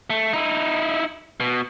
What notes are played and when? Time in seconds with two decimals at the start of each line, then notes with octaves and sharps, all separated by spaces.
0.10 A3
0.33 D#4 E4
1.40 B2